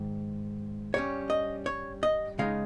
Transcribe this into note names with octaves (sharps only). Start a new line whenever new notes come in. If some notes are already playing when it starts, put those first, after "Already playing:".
Already playing: G#2 D#3
G2 G3 C#4 C#5
D#5
C#5
D#5
C#3 G#3 D#4 F5